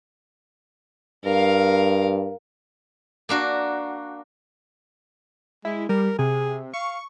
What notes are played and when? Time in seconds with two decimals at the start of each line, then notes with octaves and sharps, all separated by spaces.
1.25 G2 A#4 F5
3.29 A#3 D4 F#4
5.65 G#3 E4
5.89 G3 A#4
6.18 C3 G#4
6.74 F5 C#6